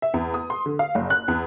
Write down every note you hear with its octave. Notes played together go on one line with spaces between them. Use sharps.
E5
E2
D#6
C6
D3
F5
F#1
F#6
E2